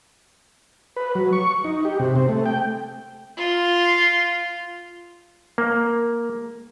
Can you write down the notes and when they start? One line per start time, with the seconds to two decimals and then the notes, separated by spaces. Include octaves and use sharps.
0.96 B4
1.15 F#3
1.33 C#6
1.64 D#4
1.85 G4
1.99 C3
2.16 C4
2.29 A3
2.46 G5
3.37 F4
5.58 A#3